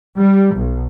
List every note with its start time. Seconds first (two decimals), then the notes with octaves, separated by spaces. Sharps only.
0.17 G3
0.56 B1